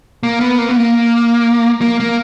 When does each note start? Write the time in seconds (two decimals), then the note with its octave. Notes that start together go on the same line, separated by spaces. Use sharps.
0.23 A#3
0.40 B3
0.59 A#3
0.69 B3
0.76 A#3
1.81 A#3
2.00 A#3